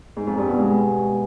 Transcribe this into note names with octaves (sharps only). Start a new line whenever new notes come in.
G#2
F2
G2
B2
G#3